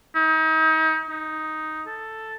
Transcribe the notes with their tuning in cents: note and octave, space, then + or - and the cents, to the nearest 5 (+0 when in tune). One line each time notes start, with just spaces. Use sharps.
D#4 +35
D#4 +5
A4 +5